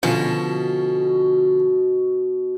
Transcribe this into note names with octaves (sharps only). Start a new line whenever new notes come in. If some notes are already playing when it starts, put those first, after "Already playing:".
B2 D3 F3 C#4